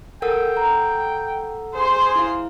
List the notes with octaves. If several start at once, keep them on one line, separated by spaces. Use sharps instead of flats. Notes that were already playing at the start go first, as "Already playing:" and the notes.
A4 A#4 F#5 G5 E6
A#5
G#4 C5 C6
E4 F5